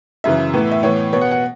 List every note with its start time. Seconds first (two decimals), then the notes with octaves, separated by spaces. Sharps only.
0.24 F#2 C#3 E3 E5
0.53 A2 E3 B3
0.72 E5
0.83 A2 E3 B3 C#5
1.13 B2 B3 C#5
1.21 F#5
1.31 F#5